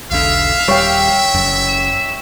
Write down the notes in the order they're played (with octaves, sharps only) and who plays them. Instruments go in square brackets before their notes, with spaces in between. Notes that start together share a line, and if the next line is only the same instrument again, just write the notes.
[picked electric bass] E1 B1 D3 [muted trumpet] E5 [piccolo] F5
[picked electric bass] D#1 G3 [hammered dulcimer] C#5 G5
[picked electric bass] F#1 F#2
[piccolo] E7